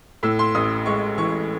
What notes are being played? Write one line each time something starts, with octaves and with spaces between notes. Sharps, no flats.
A2 E6
C6
A1 D#6
G#3 C#6
E3 C#6